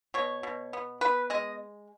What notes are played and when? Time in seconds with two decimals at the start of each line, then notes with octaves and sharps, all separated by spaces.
0.14 B2 C#5
0.43 B2
0.73 B3
1.01 B3 B4
1.30 G#3 D#5